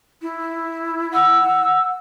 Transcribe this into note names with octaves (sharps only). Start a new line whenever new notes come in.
E4
F#5 E6